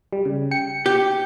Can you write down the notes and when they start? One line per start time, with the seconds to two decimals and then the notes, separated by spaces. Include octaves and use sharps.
0.13 G3
0.25 C#3
0.51 G5 C#7
0.86 G4